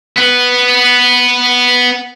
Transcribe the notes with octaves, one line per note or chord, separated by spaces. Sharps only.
B3 B4